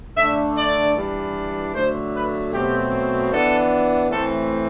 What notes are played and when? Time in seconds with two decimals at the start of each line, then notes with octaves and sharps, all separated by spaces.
0.16 D3 A3 D4 E5
0.56 D5
0.95 E3 G3 D4
1.74 D3 F#3 A3 C5
2.14 B4
2.53 B2 F#3 A3 C4 G4
3.32 E3 B3 D4 A4
4.10 A2 E3 A3 C4 A4